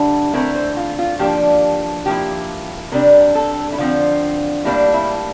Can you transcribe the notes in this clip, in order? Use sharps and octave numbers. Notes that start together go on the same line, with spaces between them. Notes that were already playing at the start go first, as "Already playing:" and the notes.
Already playing: D3 G3 E4
D3 A3 C4 E4 A#4
C5
F4
F4
F3 A#3 D4 G4
F3 A#3 E4 G4
C3 G3 D4 A#4
A4
E4
D3 F3 C4 F4
A2 G3 A#3 D4 E4
E4